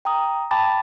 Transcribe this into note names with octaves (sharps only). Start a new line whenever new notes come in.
G5 A#5 D#6
G5 A5 B5 D6 A6